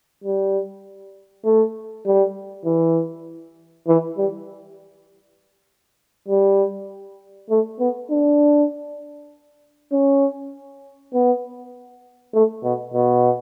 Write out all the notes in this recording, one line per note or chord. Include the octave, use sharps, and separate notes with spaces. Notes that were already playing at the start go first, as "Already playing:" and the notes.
G3
A3
G3
E3
E3
G3
G3
A3
B3
D4
C#4
B3
A3
B2
B2